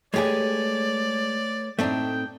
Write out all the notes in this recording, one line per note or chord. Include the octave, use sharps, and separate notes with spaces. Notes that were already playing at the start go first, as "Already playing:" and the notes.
G#3 A3 G4 G#4 B4 C#5 D5
A2 A3 C4 D4 D#4 G5